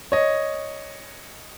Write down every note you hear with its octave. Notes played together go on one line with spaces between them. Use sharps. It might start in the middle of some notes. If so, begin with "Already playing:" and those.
C#5 D#5